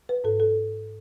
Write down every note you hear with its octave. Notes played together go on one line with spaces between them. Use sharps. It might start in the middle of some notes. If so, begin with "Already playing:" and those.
B4
G#2 A4
A4